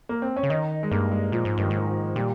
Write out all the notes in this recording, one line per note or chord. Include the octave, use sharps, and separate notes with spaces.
A#3
C4
C#4
C#3
D#3 D#4
G#3
G2 A#3
G#3
A#2 F3
G#2
G2 D#3
G#2
D#3
F3
A#2 G3